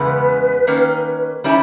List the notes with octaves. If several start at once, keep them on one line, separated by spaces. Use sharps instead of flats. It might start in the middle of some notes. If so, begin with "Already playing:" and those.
Already playing: E2 C#3 G#3 B3 B4
D#3 A#3 C#4
D#3 G3 C#4 E4